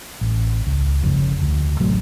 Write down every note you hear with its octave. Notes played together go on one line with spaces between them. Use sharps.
A1
C#2
G1 F2 C#3
D2
A1 C3 F#3 A3